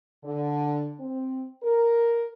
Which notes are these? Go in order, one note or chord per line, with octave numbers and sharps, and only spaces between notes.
D3
C4
A#4